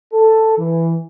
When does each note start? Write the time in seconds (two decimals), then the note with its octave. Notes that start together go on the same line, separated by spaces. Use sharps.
0.13 A4
0.56 E3